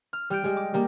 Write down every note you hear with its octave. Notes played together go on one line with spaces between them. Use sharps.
F6
G3 F6 G6 D7
G3 G#3
D6
G3 A#3